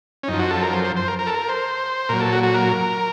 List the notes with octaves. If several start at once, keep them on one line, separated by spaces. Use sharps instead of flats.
C#4
F#2 F3 D#4
F#4
A4
A#4
C5
C5
C5
A#4
A#4
A4
A#4
C5
A#2 F#3 A#4
A4
F#4
F#4
A#4